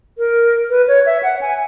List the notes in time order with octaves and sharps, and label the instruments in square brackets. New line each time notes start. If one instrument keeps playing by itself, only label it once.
[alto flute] A#4
B4
C#5
E5
F#5
G#5